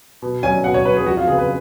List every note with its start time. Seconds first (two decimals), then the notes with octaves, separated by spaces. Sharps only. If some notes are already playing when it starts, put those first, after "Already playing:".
0.22 B2
0.43 F#3 C#4 G#5
0.64 B2 F#5
0.74 C#5
0.85 F#3 C#4 B4
0.97 G#4
1.06 F2 F#4
1.17 F4
1.27 C#3 F#3 B3 G#4
1.38 B4